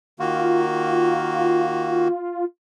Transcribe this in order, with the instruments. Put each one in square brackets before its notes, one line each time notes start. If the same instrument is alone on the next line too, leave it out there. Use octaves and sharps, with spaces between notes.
[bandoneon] D#3 A#3 F#4 [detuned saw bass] F4